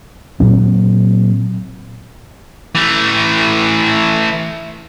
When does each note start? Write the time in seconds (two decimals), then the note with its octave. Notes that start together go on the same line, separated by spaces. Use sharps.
0.40 A#2 F#3 C4
2.75 E3 A3